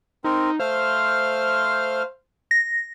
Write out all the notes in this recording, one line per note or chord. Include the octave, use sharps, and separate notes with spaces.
C4 D#4 A#4
A3 C5 F5 F6
A#6